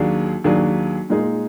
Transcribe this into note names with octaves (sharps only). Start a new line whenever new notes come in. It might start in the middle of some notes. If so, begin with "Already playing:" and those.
Already playing: D#2 D#3 F#3 D4 G#4
D#2 D#3 F#3 D4 G#4
A#2 G#3 D#4 G#4